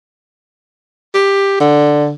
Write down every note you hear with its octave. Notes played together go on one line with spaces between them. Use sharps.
G4
D3